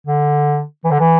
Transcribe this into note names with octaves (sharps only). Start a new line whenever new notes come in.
D3
E3
D3
E3